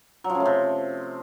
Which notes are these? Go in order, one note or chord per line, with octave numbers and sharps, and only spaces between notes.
F#3
F3
C#3
A3
C3